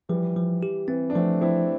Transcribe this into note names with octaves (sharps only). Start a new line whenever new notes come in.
E3 F3 G3
F3
G4
E3 C4
D4
F3 A3 C4
F3 C4 E4